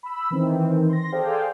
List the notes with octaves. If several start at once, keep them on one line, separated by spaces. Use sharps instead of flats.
B5 E6
D#3 E3 C4
C6 A#6
G#4 A4 C5 D5 F5 G5